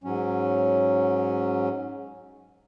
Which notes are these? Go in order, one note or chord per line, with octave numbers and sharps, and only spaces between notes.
G#2 F#3 C#4